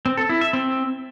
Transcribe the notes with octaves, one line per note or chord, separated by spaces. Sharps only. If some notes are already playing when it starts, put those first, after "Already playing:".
C4
A4
E4
E5
C4